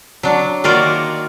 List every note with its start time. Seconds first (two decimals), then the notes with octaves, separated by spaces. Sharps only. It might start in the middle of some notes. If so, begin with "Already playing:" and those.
0.23 F#3 D4
0.64 D#3 A#3 F4 F#4 A#4 D5